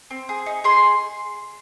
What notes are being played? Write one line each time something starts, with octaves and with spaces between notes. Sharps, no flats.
C4
G#4
D#4
G#4 C6